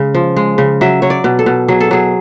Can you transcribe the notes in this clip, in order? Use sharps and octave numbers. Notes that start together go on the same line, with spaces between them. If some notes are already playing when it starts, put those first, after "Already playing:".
Already playing: C#3 G#3
F3
G#3
C#3
F#3 E5
F#3 C#5
D5
B2
A4
B2
F#3 G#4
A4
F#3 G#4